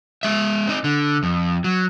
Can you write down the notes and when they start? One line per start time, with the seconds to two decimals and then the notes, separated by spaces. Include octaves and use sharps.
0.23 G#3 E5
0.67 C4 D#4
0.84 D3
1.23 F2
1.64 F#3